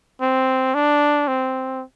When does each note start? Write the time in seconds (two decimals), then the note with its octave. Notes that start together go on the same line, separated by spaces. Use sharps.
0.21 C4
0.74 D4
1.27 C4